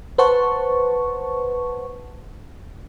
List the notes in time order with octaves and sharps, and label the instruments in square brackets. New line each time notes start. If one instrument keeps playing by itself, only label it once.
[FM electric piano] B4 C5 F#5 A5 C#6